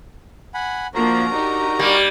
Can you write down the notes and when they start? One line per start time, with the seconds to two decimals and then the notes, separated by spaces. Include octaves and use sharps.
0.54 F#5 G#5 B5
0.95 F3 A#3 D4 F#4 A#4 A#5
1.34 D4 D#4 G4
1.79 G3 A#3